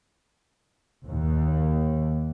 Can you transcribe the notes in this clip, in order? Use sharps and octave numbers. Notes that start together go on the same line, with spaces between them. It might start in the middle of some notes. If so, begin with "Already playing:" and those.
D#2